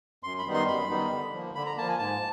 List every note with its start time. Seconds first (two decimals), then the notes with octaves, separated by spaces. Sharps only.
0.23 F#2 C6
0.39 B5
0.46 D#3 G3 B3 D#4
0.54 C6
0.68 F#2 B5
0.89 D#3 G3 B3 D#4
1.11 D3
1.33 F3 A#3
1.55 D3 B5
1.66 A#5
1.77 F3 A#3 A5
1.89 G#5
1.99 G#2 A5